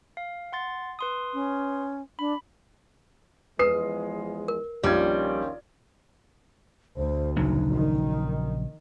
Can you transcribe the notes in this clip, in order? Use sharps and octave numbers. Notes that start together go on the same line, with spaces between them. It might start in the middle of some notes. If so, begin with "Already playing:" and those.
F5
F#5 C6 A6
B4 C6 D#6
C#4
D4 B5
E2 F3 G#3 B4 D#6 C7
A#4
A#1 D#3 G3 C#4 F4 G#6
D2 C5
A#1 C#3 F#3 D#4
D#3